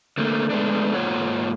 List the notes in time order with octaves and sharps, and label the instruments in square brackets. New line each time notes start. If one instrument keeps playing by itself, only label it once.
[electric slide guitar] D3 A3 A#3
G#3 A3 B3 D4
G#2 A#3 F4 C#5 F#5